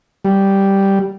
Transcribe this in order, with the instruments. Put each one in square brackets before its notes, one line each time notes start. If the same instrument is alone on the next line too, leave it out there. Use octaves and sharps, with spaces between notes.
[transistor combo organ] G3